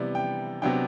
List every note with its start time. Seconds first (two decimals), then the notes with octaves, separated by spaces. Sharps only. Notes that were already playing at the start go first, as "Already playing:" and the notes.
Already playing: C3 E3 G3 B3 D5
0.15 G5
0.62 C3 F#3 B3 D4 G5